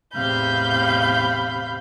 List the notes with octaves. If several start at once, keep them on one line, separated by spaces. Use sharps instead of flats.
E2 A2 C3 F5 B5 G6